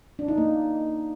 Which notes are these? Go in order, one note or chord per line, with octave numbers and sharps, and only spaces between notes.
D4
D#4
A#3